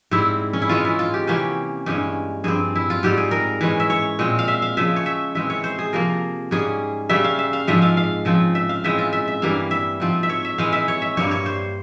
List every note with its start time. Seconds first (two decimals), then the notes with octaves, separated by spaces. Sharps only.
0.11 G#2 G3 C4 E4
0.53 C#4
0.62 E4
0.69 E3 G#3 C#4 F4
0.85 E4
0.99 F4
1.14 G4
1.27 C3 E3 A#3 C#4 G4
1.86 G2 E3 G#3 C#4 G4
2.44 G2 F3 C4 G#4
2.75 E4
2.90 F4
3.03 G#2 G3 C4 G4
3.18 G#4
3.31 A#4
3.61 E3 G#3 C#4
3.80 E5
3.90 C#5
4.19 A#2 G#3 C4
4.39 F5
4.48 E5
4.62 F5
4.77 C#3 F3 G#3 E5
4.96 C#5
5.06 E5
5.35 E3 G#3 C4 E5
5.50 C#5
5.64 C5
5.79 G#4
5.93 C3 F3 A#3 A#4
6.51 G#2 G3 A#3 C#4 G#4
7.09 C#3 G3 C#4 E5
7.24 F5
7.39 E5
7.53 F5
7.68 G#2 F3 G#3 C4 E5
7.82 F5
7.97 F5
8.25 C#3 F3 C4
8.55 E5
8.69 F5
8.84 C#3 E3 G#3 C4 E5
8.98 F4
9.13 E5
9.28 E5
9.42 G2 E3 G3 A#3 F5
9.71 E5
10.00 G#2 F3 C4
10.23 E5
10.29 C#5
10.45 E5
10.58 E3 G#3 C4 F5
10.73 E5
10.88 C#5
11.02 E5
11.17 G2 G3 A#3 C#5
11.31 C#5
11.46 C5